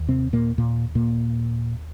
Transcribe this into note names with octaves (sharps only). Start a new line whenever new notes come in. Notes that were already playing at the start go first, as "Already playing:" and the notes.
Already playing: D#2
C3 C4
A#2 A#3
A#2 A#3
A#2 A#3